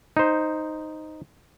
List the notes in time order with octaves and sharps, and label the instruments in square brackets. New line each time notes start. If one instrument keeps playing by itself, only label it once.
[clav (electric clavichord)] D#4 C5